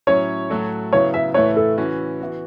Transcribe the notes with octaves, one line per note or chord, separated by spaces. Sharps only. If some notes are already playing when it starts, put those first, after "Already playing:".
A2 F#3 C#4 E4 C#5
A2 F#3 A3 F#4 A4
C#3 F#3 B3 E4 C#5
E5
A2 E3 A3 E4 B4 C#5
A4
E3 C#4 F#4 B4
E3 B3 F#4